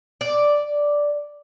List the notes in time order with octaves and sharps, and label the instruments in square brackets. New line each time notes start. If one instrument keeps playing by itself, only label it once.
[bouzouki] D5